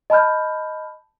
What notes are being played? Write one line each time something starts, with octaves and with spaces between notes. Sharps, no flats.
D#5 A5 B5 F6 G6